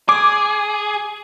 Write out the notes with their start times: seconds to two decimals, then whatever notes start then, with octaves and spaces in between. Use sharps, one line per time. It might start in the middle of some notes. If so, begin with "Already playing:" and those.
0.09 G#4 D6